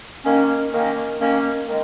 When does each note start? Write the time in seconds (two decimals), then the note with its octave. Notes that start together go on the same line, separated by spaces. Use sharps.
0.26 D#3 A#3 C#4
0.74 D#3 A#3 C#4
1.21 D#3 A#3 C#4
1.68 D#3 G#3